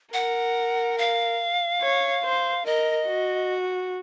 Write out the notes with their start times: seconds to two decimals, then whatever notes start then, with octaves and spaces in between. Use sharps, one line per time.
0.14 A#4 F#5
0.98 F5
1.81 C#5
2.24 C5
2.65 A#4 D#5
3.07 F#4